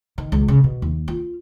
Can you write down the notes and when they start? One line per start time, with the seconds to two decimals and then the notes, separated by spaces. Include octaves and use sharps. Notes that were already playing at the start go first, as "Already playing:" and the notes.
0.18 D#3
0.32 C#2
0.48 C#3
0.64 B2
0.82 D#2
1.08 F4